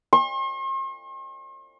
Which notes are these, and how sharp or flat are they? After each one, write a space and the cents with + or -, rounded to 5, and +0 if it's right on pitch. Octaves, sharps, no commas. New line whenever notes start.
C6 +45